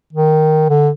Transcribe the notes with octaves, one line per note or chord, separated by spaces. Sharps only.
D#3
D3